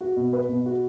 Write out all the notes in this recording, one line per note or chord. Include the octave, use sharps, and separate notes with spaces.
F#4
B2
B4
B2
F#4